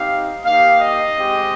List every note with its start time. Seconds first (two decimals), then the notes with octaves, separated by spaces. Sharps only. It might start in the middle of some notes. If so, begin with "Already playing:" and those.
Already playing: C4 D#4 G4 F5
0.45 A#3 D#4 G4 F5
0.81 D#5
1.17 G#3 C4 G4